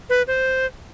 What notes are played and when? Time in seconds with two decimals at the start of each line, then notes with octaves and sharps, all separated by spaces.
0.10 B4
0.27 C5